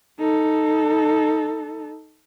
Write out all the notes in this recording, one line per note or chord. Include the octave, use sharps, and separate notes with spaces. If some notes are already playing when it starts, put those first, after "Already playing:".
D#4 A4